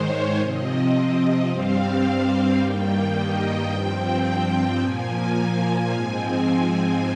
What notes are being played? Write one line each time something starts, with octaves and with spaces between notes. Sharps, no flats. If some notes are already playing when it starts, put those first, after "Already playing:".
Already playing: G#2 D#3 G#3 C5 C#5
C3 F3 C4 D#5
G2 G3 C4 F5
G2 D#3 G3 A#3 G5
D#5
G2 F3 C4 G5
G5
A#2 F3 A#3 G#5
G#2 F3 G#3 C4 G#5